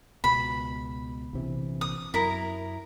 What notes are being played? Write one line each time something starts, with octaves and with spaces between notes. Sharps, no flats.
C#2 B2 B5
A#1 C3 E3
D#6
F#2 E4 A#4 A#5